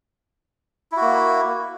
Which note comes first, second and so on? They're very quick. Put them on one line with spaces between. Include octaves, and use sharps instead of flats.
E4 F#4 A#3